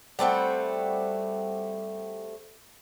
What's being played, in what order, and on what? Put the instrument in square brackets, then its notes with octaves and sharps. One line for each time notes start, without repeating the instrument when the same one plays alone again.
[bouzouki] G3 A3 C4 F#4